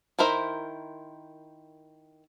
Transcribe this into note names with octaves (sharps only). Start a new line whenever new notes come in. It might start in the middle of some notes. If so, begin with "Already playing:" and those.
D#3 E4 A#4 C5 E5